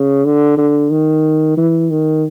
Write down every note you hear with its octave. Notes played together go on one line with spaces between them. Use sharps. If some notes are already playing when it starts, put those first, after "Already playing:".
Already playing: C#3
D3
D3
D#3
E3
D#3